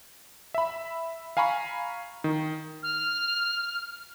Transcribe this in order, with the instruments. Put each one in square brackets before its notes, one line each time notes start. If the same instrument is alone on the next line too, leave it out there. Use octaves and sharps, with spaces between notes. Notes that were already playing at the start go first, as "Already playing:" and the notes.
[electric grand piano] E5 B5
F5 G#5 A#5 B5 C#6
D#3
[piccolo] F6